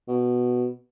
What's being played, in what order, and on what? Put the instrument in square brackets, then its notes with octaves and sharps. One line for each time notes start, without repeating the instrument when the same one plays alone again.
[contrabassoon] B2